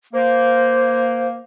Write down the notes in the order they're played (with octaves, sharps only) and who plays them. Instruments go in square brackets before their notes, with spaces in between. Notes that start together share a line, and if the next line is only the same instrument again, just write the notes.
[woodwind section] A#3 [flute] C5